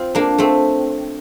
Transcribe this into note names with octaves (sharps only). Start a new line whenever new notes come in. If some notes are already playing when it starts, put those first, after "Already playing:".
Already playing: C4 F4
A#3 D4
A3 C4